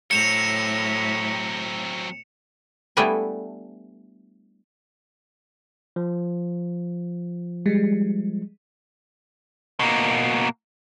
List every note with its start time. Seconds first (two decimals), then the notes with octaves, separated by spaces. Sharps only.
0.11 A2 F#3 C4 C#7 E7 F7
2.97 G3 A3 B3 D4 E4 G#5
5.96 F3
7.66 G3 G#3
9.80 B2 A#3